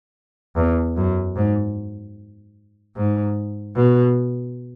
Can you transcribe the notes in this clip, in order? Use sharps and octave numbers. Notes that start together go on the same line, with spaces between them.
E2
F#2
G#2
G#2
B2